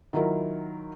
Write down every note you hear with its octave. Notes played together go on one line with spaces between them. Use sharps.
D#3 F#3 E4 F4 A#4